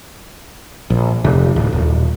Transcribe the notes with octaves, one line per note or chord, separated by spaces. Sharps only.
A#1
F1
D1
D#1